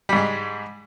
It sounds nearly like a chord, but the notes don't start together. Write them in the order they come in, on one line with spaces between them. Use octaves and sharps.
G3 G#2 G#3